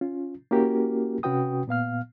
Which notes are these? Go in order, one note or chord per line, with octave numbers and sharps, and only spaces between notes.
C#4 F4
A#3 C#4 E4 F#4 G4 A#4
C3 C#4 F#4 B4 G5 D#6
A#2 B3 F5 F6